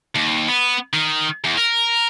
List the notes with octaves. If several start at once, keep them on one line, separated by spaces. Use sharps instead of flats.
D#2
B3
D#3
E2
A#4